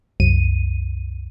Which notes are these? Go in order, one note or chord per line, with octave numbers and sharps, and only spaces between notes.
C2 F#2 D#7